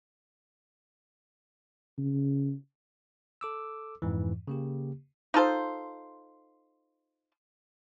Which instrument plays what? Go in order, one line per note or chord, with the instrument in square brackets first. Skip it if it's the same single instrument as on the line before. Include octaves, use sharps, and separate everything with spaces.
[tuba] C#3
[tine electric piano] A4 D6 E6
F2 G#2 E3
C#3 A#3 G4
[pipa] D#4 F4 A4 C5